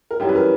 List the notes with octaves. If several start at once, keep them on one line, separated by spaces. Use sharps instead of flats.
A#4
F#2 E3 G3 G4
B4
A#4